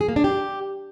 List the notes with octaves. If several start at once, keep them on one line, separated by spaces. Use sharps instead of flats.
G#4
A#3
D4
G4